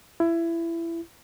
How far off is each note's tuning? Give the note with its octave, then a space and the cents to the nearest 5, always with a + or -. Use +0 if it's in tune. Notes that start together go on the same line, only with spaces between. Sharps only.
E4 +20